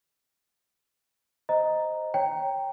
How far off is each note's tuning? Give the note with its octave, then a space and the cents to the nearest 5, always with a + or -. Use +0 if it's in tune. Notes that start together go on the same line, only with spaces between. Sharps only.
C5 +0 D#5 +0 A#5 +0
C#5 +0 G5 +0 A#5 +0